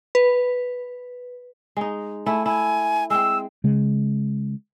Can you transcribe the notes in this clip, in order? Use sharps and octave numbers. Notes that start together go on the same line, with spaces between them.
B4
G#3 D#4
A3 E4 G#5
E4 G#5
G#3 C4 E6
C#3 G#3